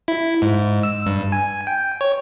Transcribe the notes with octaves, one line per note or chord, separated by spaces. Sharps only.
E4
G#2
E6
G2
G#5
G5
C#5